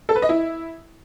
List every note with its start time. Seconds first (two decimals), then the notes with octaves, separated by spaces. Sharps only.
0.09 A4
0.16 B4
0.22 D#5
0.29 E4